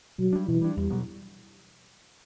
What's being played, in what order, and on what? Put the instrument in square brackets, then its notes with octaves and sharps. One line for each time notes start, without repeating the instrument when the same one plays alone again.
[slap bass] B2 [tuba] F#3
[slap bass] G3 D4
[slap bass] B2 [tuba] E3
[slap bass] G3 D4
[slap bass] E2 [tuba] G3
[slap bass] B2 F#3 B3